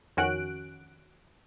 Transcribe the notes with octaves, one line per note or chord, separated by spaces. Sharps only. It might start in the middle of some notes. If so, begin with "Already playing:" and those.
F2 D#3 C#4 F#4 F#6 D7